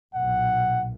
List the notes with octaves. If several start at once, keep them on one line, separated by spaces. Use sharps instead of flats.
B1 A#2 F#5